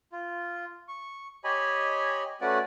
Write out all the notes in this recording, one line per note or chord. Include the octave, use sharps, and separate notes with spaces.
F4
C#6
G4 C#5 D#5 G#5 B5
A3 C#4 F#4 B4 D5 F#5